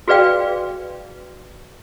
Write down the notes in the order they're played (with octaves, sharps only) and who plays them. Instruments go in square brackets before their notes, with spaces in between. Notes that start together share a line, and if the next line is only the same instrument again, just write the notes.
[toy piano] F#4 G#4 B4 D5 F5 G5